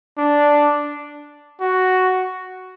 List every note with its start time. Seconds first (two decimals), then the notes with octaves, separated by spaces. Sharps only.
0.18 D4
1.60 F#4